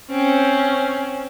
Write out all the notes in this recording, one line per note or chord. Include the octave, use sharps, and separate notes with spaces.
C4 C#4